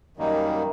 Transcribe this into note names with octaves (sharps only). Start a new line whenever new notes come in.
F#2 D#3 G3 A#3 D#4